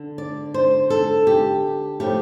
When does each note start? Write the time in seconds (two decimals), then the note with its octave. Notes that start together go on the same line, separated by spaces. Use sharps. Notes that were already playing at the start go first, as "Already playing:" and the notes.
Already playing: D3
0.18 D5
0.54 C5
0.90 A4
1.27 G4
2.00 A2 F3 A3 G4